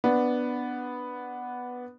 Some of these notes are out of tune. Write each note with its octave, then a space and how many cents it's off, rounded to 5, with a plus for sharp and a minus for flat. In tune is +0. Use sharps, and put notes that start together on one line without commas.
B3 +0 D4 +0